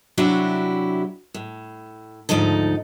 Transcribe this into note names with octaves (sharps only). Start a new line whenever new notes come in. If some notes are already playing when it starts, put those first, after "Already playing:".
C3 F#3 D4 E4 F#4 G4
A2
D2 G#2 F3 D#4 A4